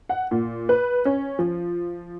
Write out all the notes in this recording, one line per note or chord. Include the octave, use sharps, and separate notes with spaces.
F#5
A#2
B4
C#4
F3